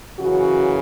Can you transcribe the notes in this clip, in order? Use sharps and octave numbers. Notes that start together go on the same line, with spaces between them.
F#2 C#3 E3 F#4